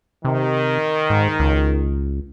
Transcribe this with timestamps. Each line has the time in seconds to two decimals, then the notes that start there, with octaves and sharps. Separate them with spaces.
0.25 C3 D#3
1.10 G#2
1.39 C#2